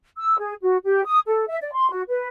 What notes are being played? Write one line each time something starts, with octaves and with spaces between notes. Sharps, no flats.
E6
G#4
F#4
G4
D#6
A4
E5
D5
C6
F#4
B4